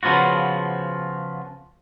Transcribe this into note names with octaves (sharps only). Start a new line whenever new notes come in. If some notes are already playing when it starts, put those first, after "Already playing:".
C#3 F3 B3 F4 F#4